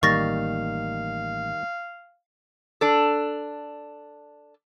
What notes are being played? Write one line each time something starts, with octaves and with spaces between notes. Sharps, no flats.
A1 D#3 G3 A#3 F5 C#6 A6 A#6
D4 A4